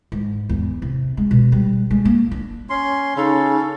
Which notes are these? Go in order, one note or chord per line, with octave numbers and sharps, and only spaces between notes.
G#2
E2
C3
G#3
B2
G3
G#3
A#3
D4
C#4 C6
C#3 D#4 A4